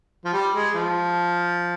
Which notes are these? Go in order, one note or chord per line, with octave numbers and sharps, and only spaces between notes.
F3
G3
G#3
F3